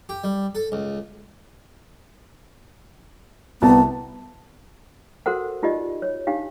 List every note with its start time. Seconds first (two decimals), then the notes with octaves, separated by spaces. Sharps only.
0.09 G4
0.24 G3
0.55 A4
0.72 C#2
3.62 C2 B3 A5
5.26 F#4 A4 A#4 C5 F#5
5.63 D#4 F4 G4 D5 D#5
6.02 C#5
6.27 D4 D#4 G4 F5